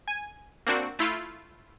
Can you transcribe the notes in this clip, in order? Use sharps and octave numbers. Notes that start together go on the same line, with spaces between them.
G#5
A#3 C4 D4 F#4
A3 E4 F4